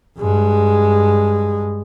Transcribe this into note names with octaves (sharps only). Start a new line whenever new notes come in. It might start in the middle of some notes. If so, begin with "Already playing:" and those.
G2 G#3